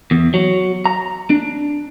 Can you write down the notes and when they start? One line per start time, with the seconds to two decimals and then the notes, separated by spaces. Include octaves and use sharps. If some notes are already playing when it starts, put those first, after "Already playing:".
0.11 E2
0.34 F#3
0.85 A#5
1.30 D4